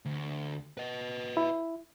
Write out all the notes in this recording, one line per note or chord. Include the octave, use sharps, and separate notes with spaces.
D2
B4 D#5
E4